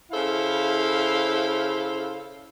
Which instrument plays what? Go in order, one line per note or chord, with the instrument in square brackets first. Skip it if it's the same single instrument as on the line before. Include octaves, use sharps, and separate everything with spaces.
[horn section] C#3 E4 A4 C5 F5